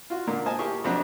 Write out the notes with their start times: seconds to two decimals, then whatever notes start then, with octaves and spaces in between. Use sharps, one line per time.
0.10 F4 F#4
0.27 A#2 D3 D4 A#4
0.45 C5 D#5 G#5 A5
0.59 A#3 G4 G#4 C#6
0.84 F2 C3 F3 F#3 D4